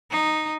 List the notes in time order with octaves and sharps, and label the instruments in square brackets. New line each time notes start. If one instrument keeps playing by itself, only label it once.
[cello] D#4